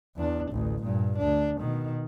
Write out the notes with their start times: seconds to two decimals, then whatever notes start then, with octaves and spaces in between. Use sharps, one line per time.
0.17 E2 D4
0.51 A1 D2
0.83 G2 A#2
1.18 D2 D4
1.58 B2 D#3